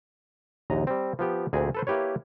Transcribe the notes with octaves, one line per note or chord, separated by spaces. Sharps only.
A#1 D#2 D#5 A#5
G3 C4
F3 B3 G4
D2 A#2 C4 G#4
A4 B4 C5
A#3 E4 G4 B4 C#5